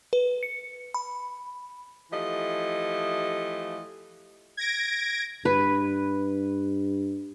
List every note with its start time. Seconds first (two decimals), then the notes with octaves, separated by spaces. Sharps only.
0.13 B4
0.43 C#7
0.94 B5
2.11 E3 F3 A3 G4 D#5
4.57 G#6 A#6 D7
5.45 G2 B4